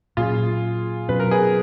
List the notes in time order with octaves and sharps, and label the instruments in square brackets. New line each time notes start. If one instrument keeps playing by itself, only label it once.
[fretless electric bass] A#2 F#3 C#4 [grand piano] F4 G#4
[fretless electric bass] B2 F#3 C#4 [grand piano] B4
[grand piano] A#4
G#4 B4